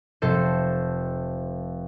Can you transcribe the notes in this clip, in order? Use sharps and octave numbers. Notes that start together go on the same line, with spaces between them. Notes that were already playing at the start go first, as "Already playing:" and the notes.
F1 A4 C5